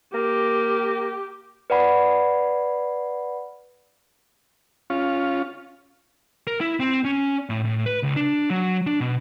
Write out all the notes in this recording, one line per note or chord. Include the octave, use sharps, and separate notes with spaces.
A#3 G4
B4 D5 F#5 B5
C#4 F4
A#4
E4
C4
C#4
A2
A2
B4
C#2
D4
F#3
D4
B2